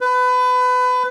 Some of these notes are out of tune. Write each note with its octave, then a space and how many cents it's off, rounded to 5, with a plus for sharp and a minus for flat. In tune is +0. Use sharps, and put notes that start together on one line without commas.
B4 +25